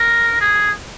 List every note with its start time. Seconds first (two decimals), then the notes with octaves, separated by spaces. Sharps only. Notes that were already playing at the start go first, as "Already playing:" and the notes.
Already playing: A#4
0.40 G#4